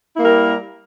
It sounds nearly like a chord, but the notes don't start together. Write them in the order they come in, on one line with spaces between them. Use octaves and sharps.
E4 A#3 G3 A#4